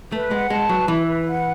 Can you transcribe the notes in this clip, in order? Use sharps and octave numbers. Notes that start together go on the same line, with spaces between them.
A3 B4
G#3 F#5
G#3 A5
F#3 B4
E3 E4
B4
F#5